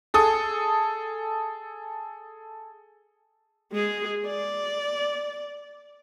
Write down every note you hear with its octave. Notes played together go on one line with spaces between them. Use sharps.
G#4 A4 D#6
G#3 G#4
D5